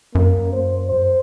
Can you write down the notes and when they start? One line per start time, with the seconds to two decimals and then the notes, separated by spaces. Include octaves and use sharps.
0.15 F#2 A#3
0.53 C5
0.89 C5